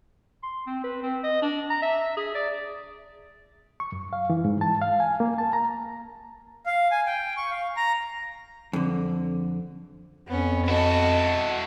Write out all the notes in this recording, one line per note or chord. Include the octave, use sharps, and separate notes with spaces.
C6
C4
B4
C4
D#5
D4
A#5
E5
G#4
D5
C#6
F#2
F5
E3
G#2
A5
F5
G#5
A#3
A5
A#5
F5
G#5
G5
C#6
F5
A#5
F2 D3
F2 B3 C#4
E4 F#4 D#5 A5